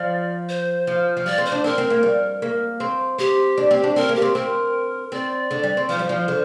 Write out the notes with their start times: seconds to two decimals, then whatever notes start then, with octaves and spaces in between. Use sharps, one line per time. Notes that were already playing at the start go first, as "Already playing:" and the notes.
Already playing: F3 D5
0.49 C5
0.87 F3
1.17 F3
1.26 G3 D5
1.38 C4
1.45 C5
1.52 D4
1.64 C4 A#4
1.78 C4
1.90 A#3
2.03 G3
2.42 A#3
2.80 C4
3.18 C4 G4
3.58 D4
3.71 C4
3.83 D4
3.96 C4 A#4
4.09 A#3
4.16 G4
4.22 C4
4.35 C4 A#4
5.12 C4 D5
5.51 D3
5.63 G3
5.77 C4
5.89 F3 C5
5.99 G3
6.09 F3
6.28 D3